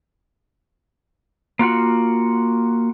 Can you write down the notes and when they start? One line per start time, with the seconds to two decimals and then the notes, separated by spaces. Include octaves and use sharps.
1.59 A#3 F4 F#4 F#5